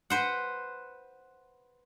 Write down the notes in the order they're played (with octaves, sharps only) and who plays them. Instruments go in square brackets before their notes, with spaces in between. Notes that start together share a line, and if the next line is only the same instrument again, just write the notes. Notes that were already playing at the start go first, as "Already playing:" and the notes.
[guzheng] B4 C5 F#5